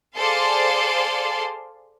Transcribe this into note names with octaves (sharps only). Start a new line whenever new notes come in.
G#4 A4 C5 D5 F5 C6